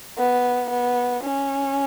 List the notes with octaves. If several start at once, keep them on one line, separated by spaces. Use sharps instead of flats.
B3
B3
C#4